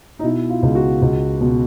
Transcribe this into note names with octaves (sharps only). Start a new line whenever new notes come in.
D#4
B2 E4
F4
C#2
F#4
C#2
B2